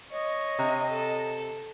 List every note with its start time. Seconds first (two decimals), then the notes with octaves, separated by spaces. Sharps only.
0.11 C#5 D#5
0.59 C3
0.87 A4